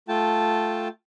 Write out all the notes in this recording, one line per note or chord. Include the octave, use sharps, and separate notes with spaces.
A3 F4 G5 A5